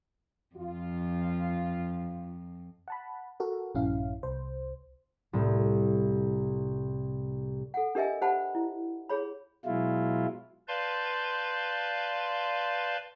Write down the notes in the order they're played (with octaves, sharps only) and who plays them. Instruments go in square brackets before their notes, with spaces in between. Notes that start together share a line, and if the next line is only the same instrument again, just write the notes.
[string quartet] F2 [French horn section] F4
[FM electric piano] F#5 A5 B5
F#4 A4 A#4
A#1 G2 C#4 E4 F5
C2 C5
[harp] C2 A2
[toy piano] A4 F#5
D4 G4 A#4 D#5 E5 G#5
G4 C5 F#5 A5 B5
E4
G#4 C#5 B5
[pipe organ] B2 F#3 G#3 E4 F4
B4 D5 F5 A5 C6 G6